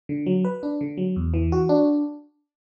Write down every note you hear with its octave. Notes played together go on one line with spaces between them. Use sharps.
D3
F#3
B4
D4
D3
F#3
E2
E3
F#4
D4